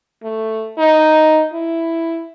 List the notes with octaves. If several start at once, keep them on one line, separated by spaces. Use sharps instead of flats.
A3
D#4
E4